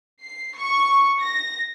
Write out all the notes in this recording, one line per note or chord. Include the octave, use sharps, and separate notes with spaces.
C7
C#6
A#6